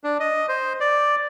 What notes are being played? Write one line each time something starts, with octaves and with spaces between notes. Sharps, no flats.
D4
D#5
C5
D5